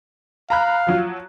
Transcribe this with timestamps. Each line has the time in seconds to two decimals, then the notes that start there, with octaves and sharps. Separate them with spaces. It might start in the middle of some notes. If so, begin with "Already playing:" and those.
0.50 F5 A#5 B5 F#6
0.87 F3 F#3 F4